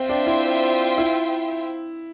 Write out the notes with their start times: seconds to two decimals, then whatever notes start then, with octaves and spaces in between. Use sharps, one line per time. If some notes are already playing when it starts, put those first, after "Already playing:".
Already playing: C4 F4 C5 E5 G5
0.09 D4
0.27 E4
0.98 E4